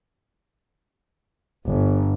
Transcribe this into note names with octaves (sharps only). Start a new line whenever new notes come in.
G1